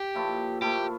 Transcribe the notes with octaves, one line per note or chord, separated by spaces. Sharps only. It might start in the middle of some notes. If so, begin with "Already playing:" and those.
Already playing: G4
A#2 F3 A3 E4
A#2 F3 A3 E4 G4